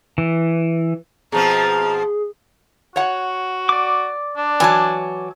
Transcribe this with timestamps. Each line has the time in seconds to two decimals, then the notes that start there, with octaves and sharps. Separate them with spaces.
0.18 E3
1.32 B2 F3 C4 G#4 A#5
2.96 F#4 C#5 F#5
3.69 D5 D6
4.37 D4
4.60 E3 F#3 G#5 A5